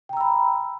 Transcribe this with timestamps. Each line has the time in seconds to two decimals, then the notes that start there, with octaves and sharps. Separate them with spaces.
0.09 G5
0.13 A#5
0.17 E6
0.21 B5